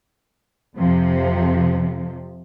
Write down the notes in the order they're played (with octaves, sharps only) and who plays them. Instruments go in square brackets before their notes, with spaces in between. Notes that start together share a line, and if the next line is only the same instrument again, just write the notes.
[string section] F2 C3 F3